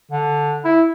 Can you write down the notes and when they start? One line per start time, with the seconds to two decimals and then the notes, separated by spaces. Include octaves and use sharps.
0.11 D3
0.65 E4